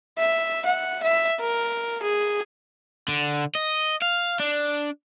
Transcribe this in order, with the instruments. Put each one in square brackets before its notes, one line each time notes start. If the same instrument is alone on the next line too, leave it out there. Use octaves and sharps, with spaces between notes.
[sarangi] E5
F#5
E5
A#4
G#4
[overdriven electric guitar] D3
D#5
F5
D4